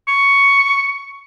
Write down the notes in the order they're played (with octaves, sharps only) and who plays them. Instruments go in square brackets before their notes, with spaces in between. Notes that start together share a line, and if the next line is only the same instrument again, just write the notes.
[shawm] C#6